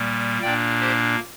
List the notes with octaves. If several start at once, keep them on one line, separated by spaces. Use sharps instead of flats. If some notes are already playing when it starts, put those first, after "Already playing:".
Already playing: A#2 G3 A#3
A#2 A#3 D4 D5 G5
G4 C5